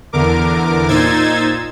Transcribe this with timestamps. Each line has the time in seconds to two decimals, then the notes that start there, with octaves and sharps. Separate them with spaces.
0.13 E2 D3 A#4 D6
0.88 A#2 D#4 C5 E6 G#6 A6